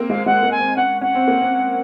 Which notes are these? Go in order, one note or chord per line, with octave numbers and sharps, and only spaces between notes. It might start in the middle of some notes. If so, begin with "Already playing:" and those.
Already playing: A#3 C4
G#3 F5
G#3 F#5
A#3
G#5
C4
C#4 F#5
C#4 F#5
C4
A#3
C4